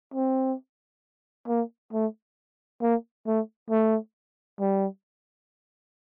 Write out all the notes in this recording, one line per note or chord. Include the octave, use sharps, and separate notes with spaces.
C4
A#3
A3
A#3
A3
A3
G3